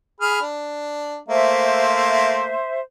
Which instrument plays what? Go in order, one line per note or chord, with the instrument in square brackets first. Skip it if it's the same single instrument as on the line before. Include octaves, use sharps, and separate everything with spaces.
[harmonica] G#4 B5 F6
D4
[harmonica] A3 A#3 [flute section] C5 E5